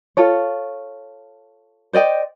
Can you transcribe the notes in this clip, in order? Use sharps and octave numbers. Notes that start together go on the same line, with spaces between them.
F4 A4 C#5
C5 D5 D#5 G5